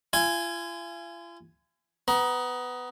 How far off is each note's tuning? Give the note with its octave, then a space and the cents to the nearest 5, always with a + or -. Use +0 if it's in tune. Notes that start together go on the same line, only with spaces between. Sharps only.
F4 -40 G#5 +0
B3 +15 A#5 +30